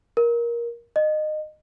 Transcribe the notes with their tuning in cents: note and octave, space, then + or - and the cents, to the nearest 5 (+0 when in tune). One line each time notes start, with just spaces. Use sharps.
A#4 +15
D#5 -20